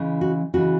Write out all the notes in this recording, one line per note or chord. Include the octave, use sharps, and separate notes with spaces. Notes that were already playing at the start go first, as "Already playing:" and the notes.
Already playing: C#3 E3 G#3
F#4
C#3 E3 G#3 F#4